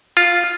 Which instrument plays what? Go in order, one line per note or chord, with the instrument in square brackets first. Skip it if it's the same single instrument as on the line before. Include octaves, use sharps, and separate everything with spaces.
[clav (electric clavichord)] F4